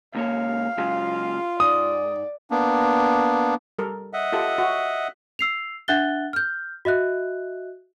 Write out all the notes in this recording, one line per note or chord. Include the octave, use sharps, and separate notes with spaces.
C#2 A#3 C#5 F5
C#3 F#3 G#3 F4
G#2 D5 D#6
A#3 B3 D4
G3 A4 A#4
D#5 E5 F#5
F4 G4 A4
F#4
E6 C7 F7
D4 E5 F#5 F#6 A6 G7
F6 G6
F#4 D#5 E5 F#6